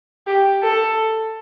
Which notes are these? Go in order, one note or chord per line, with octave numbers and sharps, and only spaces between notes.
G4
A4